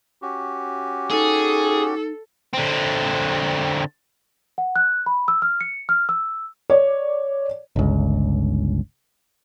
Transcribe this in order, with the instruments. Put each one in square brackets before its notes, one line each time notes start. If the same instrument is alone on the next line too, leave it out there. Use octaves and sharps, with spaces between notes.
[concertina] C#4 F#4 G4
[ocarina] D#4 [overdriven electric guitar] G#4 [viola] A4
[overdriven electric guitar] D3 C4
[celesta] F#5
F#6
B5
E6
F6
C#7
F6
E6
[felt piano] C#5 D5
[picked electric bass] G1 C#2